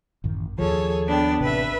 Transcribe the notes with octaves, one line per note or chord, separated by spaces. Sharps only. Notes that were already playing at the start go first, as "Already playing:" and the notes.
A1 F#2 D#3
D#2 D#3 F3 G#4 A4 C#5
B3 D4 G5
A1 C3 B4 E5